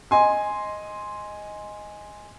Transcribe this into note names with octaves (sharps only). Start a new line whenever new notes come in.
D#5 G#5 C6